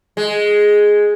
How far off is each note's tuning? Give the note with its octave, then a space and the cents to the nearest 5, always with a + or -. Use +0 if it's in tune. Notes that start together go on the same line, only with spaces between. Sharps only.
G#3 +0